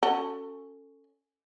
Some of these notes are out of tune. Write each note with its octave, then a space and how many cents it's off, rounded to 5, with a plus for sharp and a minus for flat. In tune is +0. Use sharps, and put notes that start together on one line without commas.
C#4 +0 F#4 -5 A4 +20